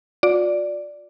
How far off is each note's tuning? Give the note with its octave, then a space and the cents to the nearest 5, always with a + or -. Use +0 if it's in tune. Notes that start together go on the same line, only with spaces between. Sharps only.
F4 +45 D5 +0